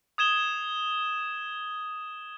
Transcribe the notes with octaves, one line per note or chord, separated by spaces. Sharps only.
D#6 G#6 E7 G7